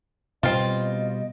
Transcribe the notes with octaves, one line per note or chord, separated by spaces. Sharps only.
B2 G3 C4 F4 D#5